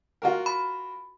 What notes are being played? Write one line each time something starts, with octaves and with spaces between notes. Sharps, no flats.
F4 F#4 A#4
B5